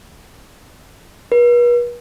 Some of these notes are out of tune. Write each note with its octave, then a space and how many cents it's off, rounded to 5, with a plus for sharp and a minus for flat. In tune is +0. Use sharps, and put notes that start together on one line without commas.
B4 -45